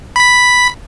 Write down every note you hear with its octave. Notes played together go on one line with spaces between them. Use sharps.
B5 B6